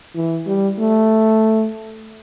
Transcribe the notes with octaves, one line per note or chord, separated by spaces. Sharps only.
E3
G3
A3